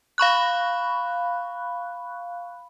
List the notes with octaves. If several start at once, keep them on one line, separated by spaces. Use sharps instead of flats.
F5 B5 C#6 F#6